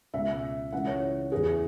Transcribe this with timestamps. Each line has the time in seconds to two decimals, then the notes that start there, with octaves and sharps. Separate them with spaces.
0.13 C#2 B2 E5
0.72 C#2 C#3 E3 F#5
0.87 C#5
1.32 E2 E3 G#4